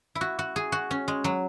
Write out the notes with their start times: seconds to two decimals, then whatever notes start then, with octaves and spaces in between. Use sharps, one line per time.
0.15 E4
0.21 F#4
0.39 F#4
0.56 G#4
0.72 F#4
0.91 C#4
1.08 G#3
1.24 F#3